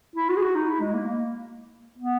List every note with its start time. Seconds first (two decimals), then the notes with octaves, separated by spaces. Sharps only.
0.16 E4
0.29 F#4
0.36 G#4
0.42 F#4
0.55 D#4
0.68 E4
0.80 G#3
0.94 A#3
1.06 A#3
1.98 B3